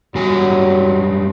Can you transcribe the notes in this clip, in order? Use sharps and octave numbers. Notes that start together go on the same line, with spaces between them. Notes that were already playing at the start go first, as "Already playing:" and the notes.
F#2 F#3 G3 G#5